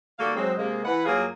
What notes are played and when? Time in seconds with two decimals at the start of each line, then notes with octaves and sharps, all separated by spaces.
0.19 D#3 G3 A#3 F#4 A4 F5
0.35 F#3 G#3 C4
0.58 C3 G#3 A#3
0.85 E3 B4 F#5
1.05 G2 F#3 A#3 F4 F#4 G#4